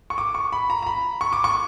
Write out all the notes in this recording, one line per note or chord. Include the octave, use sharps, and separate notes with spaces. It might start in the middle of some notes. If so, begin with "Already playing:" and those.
C#6
D6
C#6
B5
A#5
A#5
B5
C#6
D6
C#6